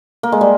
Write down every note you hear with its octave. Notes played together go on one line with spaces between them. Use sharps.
A#3
G#3
G3